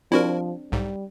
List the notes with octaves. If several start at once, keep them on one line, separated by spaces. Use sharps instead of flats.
F3 C4 D4 E4 F#4 A#4
B1 G#2 G3